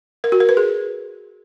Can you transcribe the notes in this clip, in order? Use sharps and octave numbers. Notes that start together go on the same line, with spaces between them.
A#4
F#4
A#4
B4
G#4